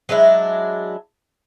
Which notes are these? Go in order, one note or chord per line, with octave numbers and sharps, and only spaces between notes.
F#3 G#3 D4 E4